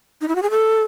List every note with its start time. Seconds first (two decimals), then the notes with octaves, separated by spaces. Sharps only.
0.21 D#4
0.28 E4
0.35 F#4
0.43 G#4
0.51 A4